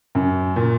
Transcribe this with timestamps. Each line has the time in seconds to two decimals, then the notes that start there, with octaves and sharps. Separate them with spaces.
0.15 F#2
0.56 A#2